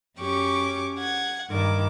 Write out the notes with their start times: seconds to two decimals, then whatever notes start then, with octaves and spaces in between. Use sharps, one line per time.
0.18 F#2 C#4 G4 C#6 D6
0.98 F#5 G#6
1.49 G2 D#3 D6